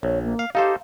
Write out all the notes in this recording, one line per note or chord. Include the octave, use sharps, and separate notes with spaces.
A#1 C#5
A#3
F5
D#4 G4 A4 C5 F5